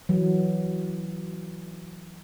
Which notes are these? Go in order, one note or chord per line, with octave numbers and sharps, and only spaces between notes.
E3 F#3